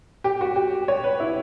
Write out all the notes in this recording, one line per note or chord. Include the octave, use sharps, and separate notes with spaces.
G4
F#4
G4
C#5
B4
E4